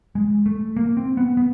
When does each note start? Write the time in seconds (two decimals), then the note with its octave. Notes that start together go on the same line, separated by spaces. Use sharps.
0.15 G#3
0.46 A3
0.77 A#3
0.97 C4
1.17 B3
1.37 B3